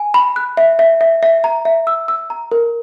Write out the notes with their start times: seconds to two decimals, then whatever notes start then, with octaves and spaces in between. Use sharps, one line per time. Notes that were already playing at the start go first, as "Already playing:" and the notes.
Already playing: G#5
0.14 B5
0.36 F#6
0.57 E5
0.79 E5
1.01 E5
1.23 E5
1.44 A#5
1.65 E5
1.87 E6
2.08 E6
2.30 A#5
2.52 A#4